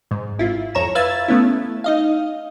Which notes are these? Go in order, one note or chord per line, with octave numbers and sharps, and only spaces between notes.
G#2
G#1 E4 F4
F2 C#5 A#5 E7
B4 E5 F5 E6 G#6 A6
A3 B3 C#4 E4
D#4 D#5 F5